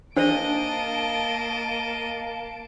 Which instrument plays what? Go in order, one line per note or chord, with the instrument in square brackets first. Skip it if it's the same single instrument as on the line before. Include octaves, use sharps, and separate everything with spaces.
[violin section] A#3 A5 D7 [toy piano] D4 C5 [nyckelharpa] D#5